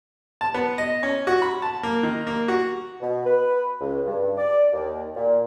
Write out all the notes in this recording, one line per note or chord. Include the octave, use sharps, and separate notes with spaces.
A5
B3
D#5
C#4
F#4
B5
A5
A#3
D#3
A#3
F#4
B2
B4
C#2
G2
D5
D#2
A#2